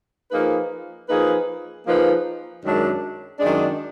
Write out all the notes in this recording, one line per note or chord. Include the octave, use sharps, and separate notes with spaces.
F3 A#3 D#4 G#4 B4
F3 A#3 D#4 G#4 B4
F3 A#3 D#4 G#4 B4
F#2 D#3 G#3 D4
F#2 D#3 G#3 D4